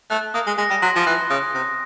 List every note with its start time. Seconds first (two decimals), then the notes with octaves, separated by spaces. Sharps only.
0.10 A3 F#6
0.34 A#3 D#6
0.47 G#3
0.58 G#3 A#6
0.70 G3
0.82 F#3 C6
0.95 F3
1.06 E3 F#6
1.30 C#3 D#6
1.55 C3 A#6